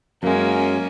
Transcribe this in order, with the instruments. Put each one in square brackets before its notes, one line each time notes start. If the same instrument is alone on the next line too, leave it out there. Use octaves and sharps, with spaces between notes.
[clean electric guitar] F#2 G#3 [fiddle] A#3 C#4